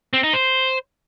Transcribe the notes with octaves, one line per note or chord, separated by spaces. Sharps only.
C4
D#4
C5